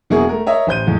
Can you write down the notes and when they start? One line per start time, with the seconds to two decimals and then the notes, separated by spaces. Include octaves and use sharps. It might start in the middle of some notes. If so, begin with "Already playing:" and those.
0.10 E1 B2 F#3 A#3 E4 G#4
0.29 A3 A#4
0.46 A#4 C#5 D#5 E5
0.67 A1 C5 G6 D#7
0.86 E2 A2 G#3